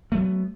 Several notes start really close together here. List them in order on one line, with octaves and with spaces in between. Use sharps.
A3 F#3 B3